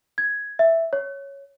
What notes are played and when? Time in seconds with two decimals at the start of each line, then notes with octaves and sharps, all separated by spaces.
0.18 G#6
0.59 E5
0.93 C#5